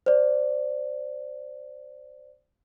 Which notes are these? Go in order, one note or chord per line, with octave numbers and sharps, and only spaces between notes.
C5 D5